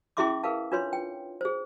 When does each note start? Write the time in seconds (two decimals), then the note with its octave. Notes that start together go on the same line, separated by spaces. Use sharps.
0.17 C#4 E4 G#4 E5 C6 D6
0.44 G#4 A#4 B4 F5 A5
0.72 D4 F4 B4 C#5 C6
0.93 G5
1.41 G#4 C5